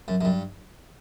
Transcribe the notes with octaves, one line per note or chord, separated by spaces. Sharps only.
F#2
F#2
G2